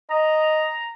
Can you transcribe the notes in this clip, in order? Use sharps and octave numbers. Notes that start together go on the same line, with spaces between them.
D#5 A#5